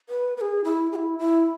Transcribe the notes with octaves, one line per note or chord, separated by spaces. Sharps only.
B4
B4
G#4
E4
G#4
E4
E4